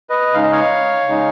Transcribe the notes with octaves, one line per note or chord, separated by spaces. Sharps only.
B4 D#5
C#3 G#3 D#4 F5
D#5
C#5 F5
C#3 G#3 D#4